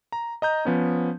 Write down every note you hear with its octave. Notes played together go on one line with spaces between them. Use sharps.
A#5
D#5 A#5 G6
F3 B3 C#4